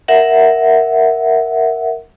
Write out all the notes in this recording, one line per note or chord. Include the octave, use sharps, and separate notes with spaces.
A#4 E5 F#5